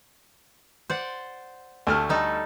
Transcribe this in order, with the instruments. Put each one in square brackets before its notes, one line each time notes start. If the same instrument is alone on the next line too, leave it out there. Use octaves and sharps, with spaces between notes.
[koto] C5 D5 F#5
[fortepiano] D2 A3 F6
[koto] G3 D#4 A4